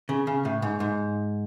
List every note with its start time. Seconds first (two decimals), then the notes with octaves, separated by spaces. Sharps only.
0.09 C#3
0.27 C#3
0.45 A2
0.62 G#2
0.80 G#2